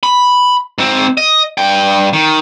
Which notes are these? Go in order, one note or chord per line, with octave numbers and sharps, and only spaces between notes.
B5
G#2 C4
D#5
G2 G5
D#3